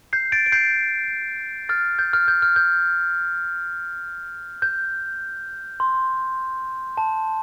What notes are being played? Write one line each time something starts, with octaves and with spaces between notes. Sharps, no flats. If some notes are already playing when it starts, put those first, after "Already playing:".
G6 C7
A6 D7
D7
G6 C7
F6 A6
G6
F6
G6
F6
G6
G6
C6
A5